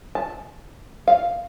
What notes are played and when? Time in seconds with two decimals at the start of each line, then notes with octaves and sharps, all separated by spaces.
0.15 A5
1.08 F5